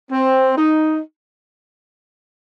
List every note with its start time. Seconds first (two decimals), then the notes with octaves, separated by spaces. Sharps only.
0.12 C4
0.58 D#4